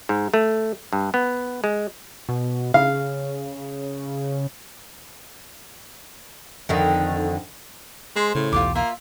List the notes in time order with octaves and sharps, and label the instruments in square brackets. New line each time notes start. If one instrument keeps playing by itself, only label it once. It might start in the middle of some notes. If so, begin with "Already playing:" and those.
[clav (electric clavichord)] G#2
A3
G2
B3
G#3
[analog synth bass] B2
[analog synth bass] C#3 [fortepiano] F5
[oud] F2 D3 D#3
[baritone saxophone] G#3 [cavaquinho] C5
[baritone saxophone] A2 [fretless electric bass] C#3
[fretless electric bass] B1 E2 [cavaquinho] F4 G4 D6
[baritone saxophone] A#3 [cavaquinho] F4 E5